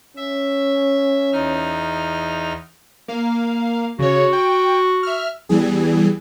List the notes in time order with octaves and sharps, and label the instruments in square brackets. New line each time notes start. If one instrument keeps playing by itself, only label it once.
[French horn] C#4 [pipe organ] E5
[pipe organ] E2 D#4 F6
[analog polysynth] A#3 F5
[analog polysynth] C#3 C#5 [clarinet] F#4
[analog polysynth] G5
E5 F6
[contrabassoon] E2 [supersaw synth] E3 G3 G#4